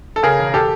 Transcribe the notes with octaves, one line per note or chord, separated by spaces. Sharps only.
A4
C#3 G#4 A#4
E1
G4 A4